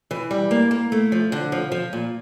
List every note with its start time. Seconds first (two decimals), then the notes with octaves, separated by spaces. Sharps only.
0.11 E3
0.31 G3
0.51 A#3
0.71 A#3
0.92 A3
1.12 F3
1.32 D3
1.52 F3
1.72 F3
1.93 A#2